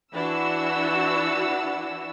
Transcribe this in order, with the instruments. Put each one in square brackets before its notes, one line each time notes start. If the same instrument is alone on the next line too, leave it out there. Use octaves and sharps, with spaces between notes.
[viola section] E3 D4 E4 [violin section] F#4 E6